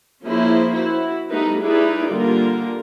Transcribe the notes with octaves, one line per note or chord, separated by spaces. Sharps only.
F3 A#3 C#4 E4 G#4 C5
E4 F#4
G3 A3 B3 D#4 A#4 B4
D#4 E4 G#4 B4 D5
D3 G3 A#3 F4 A#4